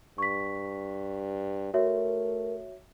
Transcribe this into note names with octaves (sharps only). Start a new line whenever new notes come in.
G2 C#6 B6
A3 F#4 A#4 C#5 E5